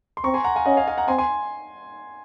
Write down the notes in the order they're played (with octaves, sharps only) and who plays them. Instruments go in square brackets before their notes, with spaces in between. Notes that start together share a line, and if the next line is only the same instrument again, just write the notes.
[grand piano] C6
[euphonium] C4 [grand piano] A#5 C#6
[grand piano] G#5 C6
F#5 A#5
F5 G#5
[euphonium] C#4 [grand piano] D#5 F#5
[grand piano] F5 G#5
F5 G#5
F#5 A#5
[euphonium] C4 [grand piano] G#5 C6
[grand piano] G#5 C6